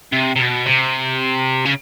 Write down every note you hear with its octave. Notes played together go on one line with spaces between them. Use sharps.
C3
C3
B2
C3
C#3